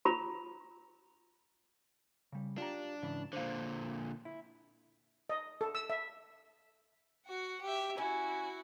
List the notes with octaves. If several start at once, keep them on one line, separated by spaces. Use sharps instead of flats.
F4 A#5 B5
C#3 G3
D4 F4 G4 A#5
G#2 C#3 E3
A#2 D3 C5 F5
E4
D#5
A4
E6
E5
F#4 F#5
G4 E5
C#4 E4 F#4